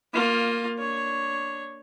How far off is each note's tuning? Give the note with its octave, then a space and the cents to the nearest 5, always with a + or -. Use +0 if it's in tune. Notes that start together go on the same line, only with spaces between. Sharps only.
A#3 +0 F4 +15
D4 +0 C#5 +0